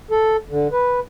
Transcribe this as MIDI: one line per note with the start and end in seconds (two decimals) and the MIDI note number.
0.11 0.37 69
0.49 0.68 50
0.72 1.00 71